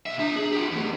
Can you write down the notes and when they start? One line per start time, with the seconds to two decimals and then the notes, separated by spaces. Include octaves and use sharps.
0.06 B2 E5
0.19 D4 A#5
0.36 G#4
0.52 F4 G4
0.72 E2 A3